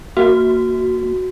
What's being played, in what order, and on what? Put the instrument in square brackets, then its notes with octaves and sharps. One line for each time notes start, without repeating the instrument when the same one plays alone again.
[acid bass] A#3 [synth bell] F#4